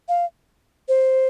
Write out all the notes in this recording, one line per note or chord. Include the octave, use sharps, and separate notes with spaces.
F5
C5